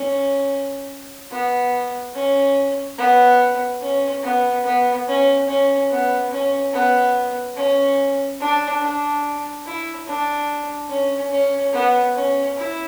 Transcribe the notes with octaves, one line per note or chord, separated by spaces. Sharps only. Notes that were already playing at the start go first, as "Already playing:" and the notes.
Already playing: C#4
B3
C#4
B3
C#4
B3
B3
C#4
C#4
B3
C#4
B3
C#4
D4
D4
E4
D4
C#4
C#4
B3
C#4
E4